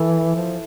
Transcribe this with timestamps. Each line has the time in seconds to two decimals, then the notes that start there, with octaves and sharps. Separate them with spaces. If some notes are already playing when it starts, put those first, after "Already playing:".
Already playing: E3 E4 A4
0.36 F3